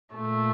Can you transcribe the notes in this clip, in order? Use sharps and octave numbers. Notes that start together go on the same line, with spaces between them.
A#2 A3